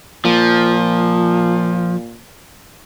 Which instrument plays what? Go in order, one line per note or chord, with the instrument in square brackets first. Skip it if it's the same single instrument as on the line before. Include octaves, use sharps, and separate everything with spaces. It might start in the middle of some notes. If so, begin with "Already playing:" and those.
[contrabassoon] A#2 [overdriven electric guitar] F3